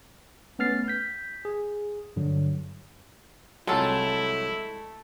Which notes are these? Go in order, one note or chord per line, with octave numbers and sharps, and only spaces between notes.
A3 B3 C#4 F6 A6 C7
G6 B6
G#4
G2 D3 F#3
C2 F#3 G#3 A3 E4 F4 A4